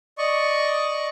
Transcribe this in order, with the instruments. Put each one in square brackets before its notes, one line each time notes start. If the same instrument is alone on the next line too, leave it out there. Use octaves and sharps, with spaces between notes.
[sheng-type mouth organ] D5 D#5 C#6